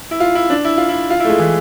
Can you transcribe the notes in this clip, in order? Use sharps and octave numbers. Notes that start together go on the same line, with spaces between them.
E4
F4
E4
D4
E4
F4
E4
F4
A3 E4
G#3
E3